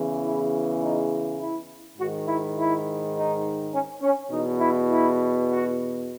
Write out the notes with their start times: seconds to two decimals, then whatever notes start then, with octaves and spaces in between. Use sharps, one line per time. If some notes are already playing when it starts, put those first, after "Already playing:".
Already playing: E2 C#3 E3
0.23 E4
0.81 D#4
1.39 E4
1.97 G#2 D#3 F#4
2.27 E4
2.56 E4
3.14 D#4
3.72 C#4
4.02 C#4
4.31 E2 B2 D#4
4.60 E4
4.90 E4
5.48 F#4